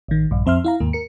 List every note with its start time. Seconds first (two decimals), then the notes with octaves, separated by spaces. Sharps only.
0.08 A1 D#3
0.31 A#1 G2
0.46 F2 C4 E5 C6 F6
0.64 E4 F5 A#5
0.80 D#2 G#2 A#3
0.93 A#4 C#7